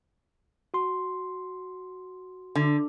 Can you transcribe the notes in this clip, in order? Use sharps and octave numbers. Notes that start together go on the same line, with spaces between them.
F#4 C6
D3